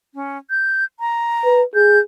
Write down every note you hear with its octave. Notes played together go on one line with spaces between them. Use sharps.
C#4
G6
A#5
B4
G#4 G6